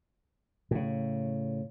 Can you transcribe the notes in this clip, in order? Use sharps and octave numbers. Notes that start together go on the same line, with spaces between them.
A2 C#3